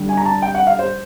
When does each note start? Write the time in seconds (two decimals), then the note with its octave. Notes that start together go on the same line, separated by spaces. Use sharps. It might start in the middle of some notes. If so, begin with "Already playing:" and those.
Already playing: D3 G3
0.09 G#5
0.17 A#5
0.25 A5
0.42 G5
0.55 F#5
0.67 F5
0.79 C5